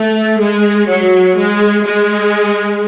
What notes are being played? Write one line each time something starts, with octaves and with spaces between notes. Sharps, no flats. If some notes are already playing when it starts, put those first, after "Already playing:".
Already playing: A3
G#3
F#3
G#3
G#3